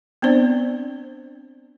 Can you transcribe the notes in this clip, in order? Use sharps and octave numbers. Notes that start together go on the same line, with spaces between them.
B3 C4 D4 C5 D5